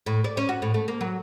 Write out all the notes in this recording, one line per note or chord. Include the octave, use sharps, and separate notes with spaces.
A2
D5
C#4
F#4
A2
A3
A#3
F#3